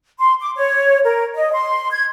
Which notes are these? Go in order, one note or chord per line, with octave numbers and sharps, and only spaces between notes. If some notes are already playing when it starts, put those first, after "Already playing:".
C6
D6
C#5
A#4
D#5
C6
G#6